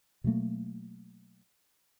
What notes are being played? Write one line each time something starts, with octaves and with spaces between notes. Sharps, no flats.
B2 F#3 A3 A#3